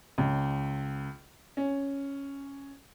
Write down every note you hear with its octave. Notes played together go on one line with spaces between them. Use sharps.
C#2
C#4